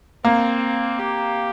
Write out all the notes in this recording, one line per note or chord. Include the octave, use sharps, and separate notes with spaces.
A#3 C4
G4